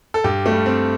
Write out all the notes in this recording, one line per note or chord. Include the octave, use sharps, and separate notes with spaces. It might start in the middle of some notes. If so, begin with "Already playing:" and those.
A4
G2 G4
A3
G3
C4